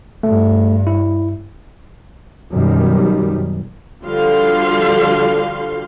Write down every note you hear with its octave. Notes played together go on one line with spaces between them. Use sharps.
G2 A3
E4
F#2 B2 D#3 G3
D3 F3 G3 F#4 F5 C6